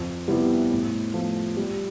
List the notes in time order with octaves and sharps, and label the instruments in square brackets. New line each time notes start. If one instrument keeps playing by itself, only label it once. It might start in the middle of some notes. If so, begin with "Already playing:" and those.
Already playing: [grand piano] F2
C3 G3 B3 E4
A2
F3 A3
G3